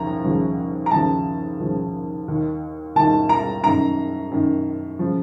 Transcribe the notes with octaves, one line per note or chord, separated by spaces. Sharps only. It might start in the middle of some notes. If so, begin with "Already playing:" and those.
Already playing: D#2 C#3 F3 A#5
D#2 C#3 F3
A#5
D#2 C#3 F3 A5
D#2 C#3 F3
D#2 D#3
D#2 D#3 A5
A#5
F#2 D#3 A#5
F#2 D#3
C#3 F3